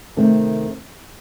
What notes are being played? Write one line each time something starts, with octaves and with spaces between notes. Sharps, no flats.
C3 D#3 A3 C4